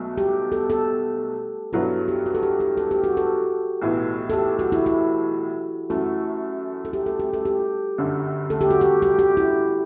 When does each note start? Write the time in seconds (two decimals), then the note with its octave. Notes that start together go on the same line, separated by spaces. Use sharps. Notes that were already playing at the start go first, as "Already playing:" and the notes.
Already playing: B1 B2 F#3 A3
0.18 G4
0.52 A4
0.70 A4
1.73 G2 F#3 B3 E4 A4
2.08 G4
2.26 F#4
2.35 A4
2.43 G4
2.60 G4
2.77 A4
2.91 G4
3.04 F#4
3.17 A4
3.82 B1 A2 E3 B3
4.30 A4
4.33 G4
4.59 F#4
4.72 E4
4.86 E4
5.90 F#2 E3 A3 F#4
6.85 A4
6.93 G4
7.06 A4
7.20 G4
7.33 A4
7.45 G4
7.98 G1 F#2 D3
8.50 A4
8.61 G4
8.70 F#4
8.81 G4
9.02 G4
9.19 G4
9.37 E4